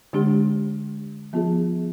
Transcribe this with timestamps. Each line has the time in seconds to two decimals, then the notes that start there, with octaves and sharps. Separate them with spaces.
0.13 D3 G#3 D4 G4
1.33 F3 B3 F4 G#4